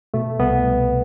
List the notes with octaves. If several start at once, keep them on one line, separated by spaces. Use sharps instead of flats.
B2 A3
C2 B3
C2